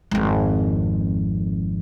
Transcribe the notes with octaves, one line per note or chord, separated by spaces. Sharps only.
G#1 F2